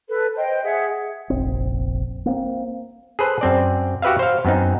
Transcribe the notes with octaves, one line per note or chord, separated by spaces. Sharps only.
A4 B4
C5 D#5 G5
G#4 E5 F#5
F1 A#1 C4
A#3 C4
G#4 A4 B4 C5
F#2 C4 D5
F#4 G4 B4 E5 F5
C5 F5
F#2 B3 C4 D#4